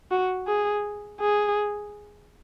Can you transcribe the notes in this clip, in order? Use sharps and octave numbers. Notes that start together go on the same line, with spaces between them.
F#4
G#4
G#4